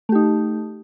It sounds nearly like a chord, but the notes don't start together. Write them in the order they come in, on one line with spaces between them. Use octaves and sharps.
A3 G4 D#4